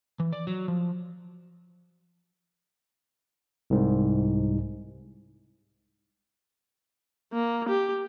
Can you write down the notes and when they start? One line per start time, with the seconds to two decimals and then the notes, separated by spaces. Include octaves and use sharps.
0.20 E3
0.33 D5
0.47 F#3
0.68 F3
3.70 C2 G#2
7.33 A#3
7.69 G4